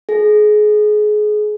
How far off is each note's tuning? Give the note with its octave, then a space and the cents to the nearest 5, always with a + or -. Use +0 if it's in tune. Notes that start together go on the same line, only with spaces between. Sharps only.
G#4 +25